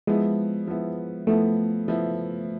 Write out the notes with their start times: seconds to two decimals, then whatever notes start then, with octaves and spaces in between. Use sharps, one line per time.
0.07 F3 G#3 B3 E4
0.67 F3 B3 E4
1.27 F3 A3 B3 E4
1.88 F3 B3 E4